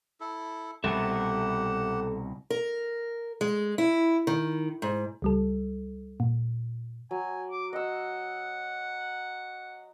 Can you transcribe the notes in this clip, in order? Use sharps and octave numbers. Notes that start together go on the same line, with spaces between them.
E4 A4
C2 B2 G4 A4 E5 F#5
A#4
G#3
E4
D#3
G#2
C#2 G3 A4
A#2
F#3 G#5
D6
D#5 F#5 E6